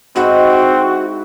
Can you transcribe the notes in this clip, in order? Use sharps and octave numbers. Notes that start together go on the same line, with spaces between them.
G#2 C4 E4 F#4 B4